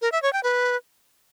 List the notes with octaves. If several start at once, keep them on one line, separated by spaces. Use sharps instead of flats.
A#4
E5
C#5
G5
B4